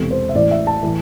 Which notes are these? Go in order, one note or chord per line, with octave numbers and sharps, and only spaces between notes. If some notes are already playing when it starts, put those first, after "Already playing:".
Already playing: E1 E2 C3 A4
C5
E5
A1 A2 E3 D5
E5
A5
A2 E3